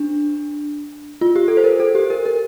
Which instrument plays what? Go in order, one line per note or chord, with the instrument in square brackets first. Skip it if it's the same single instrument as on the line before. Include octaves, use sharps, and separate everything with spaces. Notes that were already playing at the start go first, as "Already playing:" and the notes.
Already playing: [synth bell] D4
F4
G4
A4
C5
A#4
A4
G4
A#4
A#4